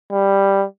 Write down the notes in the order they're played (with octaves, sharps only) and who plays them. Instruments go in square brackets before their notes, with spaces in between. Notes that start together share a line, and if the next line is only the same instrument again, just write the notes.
[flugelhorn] G3